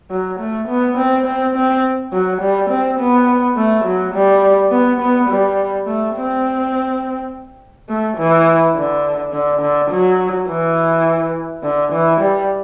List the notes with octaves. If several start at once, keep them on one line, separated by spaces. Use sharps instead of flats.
F#3
A3
B3
C4
C4
C4
F#3
G3
C4
B3
A3
F#3
G3
B3
B3
G3
A3
C4
A3
E3
D3
D3
D3
F#3
E3
D3
E3
G3